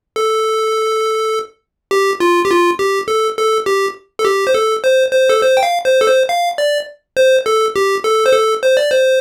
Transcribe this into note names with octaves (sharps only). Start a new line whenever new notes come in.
A4
G4
F4
G4
F4
G4
A4
A4
G4
A4
G4
C5
A4
C5
C5
A4
C5
G5
F5
C5
A4
C5
F5
D5
C5
A4
G4
A4
C5
A4
C5
D5
C5